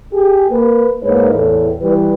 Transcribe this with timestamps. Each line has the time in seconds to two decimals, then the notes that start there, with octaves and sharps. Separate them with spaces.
0.13 G4 G#4
0.50 A#3 B4
1.03 G#2 G#3 A#3 B4 C#5
1.33 E2 A2
1.81 E3 G3 B4